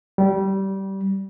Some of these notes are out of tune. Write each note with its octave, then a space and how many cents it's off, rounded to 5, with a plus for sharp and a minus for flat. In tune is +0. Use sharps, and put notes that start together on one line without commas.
G3 -20